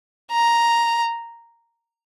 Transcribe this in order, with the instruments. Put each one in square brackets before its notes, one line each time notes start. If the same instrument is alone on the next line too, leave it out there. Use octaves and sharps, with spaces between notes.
[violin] A#5